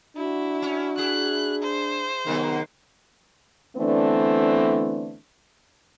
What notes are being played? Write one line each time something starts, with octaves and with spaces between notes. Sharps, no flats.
D4 E4 F#4
C#4
E4 G#4 F#6
C5
C3 D#3 F#3 G#3 B3
D3 E3 A3 B3 C4 D4